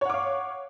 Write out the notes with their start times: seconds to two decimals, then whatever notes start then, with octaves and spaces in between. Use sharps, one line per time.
0.01 C#5
0.05 F#5
0.09 D6
0.14 F5